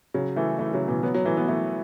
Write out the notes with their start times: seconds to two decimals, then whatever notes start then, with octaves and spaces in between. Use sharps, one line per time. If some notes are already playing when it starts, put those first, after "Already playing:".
0.14 C#3 F#3
0.36 E3 A3
0.59 E3 A3
0.74 C#3 F#3
0.88 B2 E3
1.03 F#3 B3
1.14 F#3 B3
1.25 E3 A3
1.37 F#3 B3
1.48 E3 A3